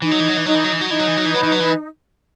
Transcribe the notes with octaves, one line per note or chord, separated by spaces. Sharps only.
E3 D#4
F#3
E3
F#3
E3
F#3 D#4
E3
F#3
E3
F#3
E3 D#4
F#3
E3
F#3
E3
F#3 B4
E3
F#3
E3